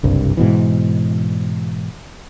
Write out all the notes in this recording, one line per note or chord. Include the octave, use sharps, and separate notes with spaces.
F#1 C2 G2
G#2 B2 E3